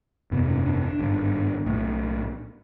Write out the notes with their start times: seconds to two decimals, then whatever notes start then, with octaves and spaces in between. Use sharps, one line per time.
0.31 G1 F2 C3 B3
0.48 C#4
0.65 D4
0.82 D4
0.99 G#1 G2 D3
1.66 B1 A2